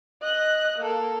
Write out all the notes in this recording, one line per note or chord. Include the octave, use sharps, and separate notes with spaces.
D#5 F#6
A#3 A4